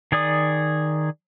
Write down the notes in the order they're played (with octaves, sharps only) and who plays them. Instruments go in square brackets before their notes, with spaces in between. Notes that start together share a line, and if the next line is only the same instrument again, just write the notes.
[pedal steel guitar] D#3 G#4 D5 D#6